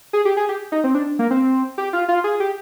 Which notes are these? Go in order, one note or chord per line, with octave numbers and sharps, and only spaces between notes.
G#4
G4
G#4
G4
D#4
C4
D4
A#3
C4
G4
F4
F4
G#4
G4